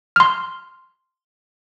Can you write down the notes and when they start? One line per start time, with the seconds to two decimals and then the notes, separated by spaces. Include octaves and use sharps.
0.16 C6 F6